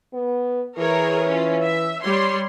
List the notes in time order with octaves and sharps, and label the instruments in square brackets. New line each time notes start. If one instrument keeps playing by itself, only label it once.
[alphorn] B3
[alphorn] E3 [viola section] G#4 A#4 C#5
[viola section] C#4 F4
E5
G3 C#5 C6